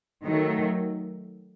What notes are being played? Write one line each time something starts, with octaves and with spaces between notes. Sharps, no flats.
D#3 F#3 A3